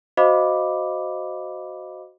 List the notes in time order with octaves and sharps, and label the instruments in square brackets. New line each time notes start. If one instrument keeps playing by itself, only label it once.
[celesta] F#4 C5 D#5 F5 B5 D6